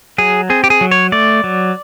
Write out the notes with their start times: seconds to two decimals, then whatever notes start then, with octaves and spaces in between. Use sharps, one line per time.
0.18 F#3 G#4
0.50 C4 G#4
0.64 G4
0.70 G#4
0.81 F#3
0.91 C#5
1.12 A3 D5
1.44 F#3